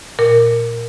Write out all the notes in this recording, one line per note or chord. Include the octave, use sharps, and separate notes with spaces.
A#2 A#4